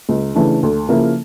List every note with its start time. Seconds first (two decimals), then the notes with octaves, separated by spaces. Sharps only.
0.09 C#2
0.35 C#3 E3 A3 D4
0.63 D2
0.89 C#3 F3 A#3 E4